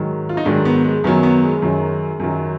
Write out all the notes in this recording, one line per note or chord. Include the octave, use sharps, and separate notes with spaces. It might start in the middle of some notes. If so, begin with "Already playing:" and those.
Already playing: G#2 D#3 F#3
F4
D#4
G#2 D#3 F#3 D4
B3
G#3
F#2 D#3 F#3 B3
B3
G#3
F#2 D#3 F#3
F#2 D#3 F#3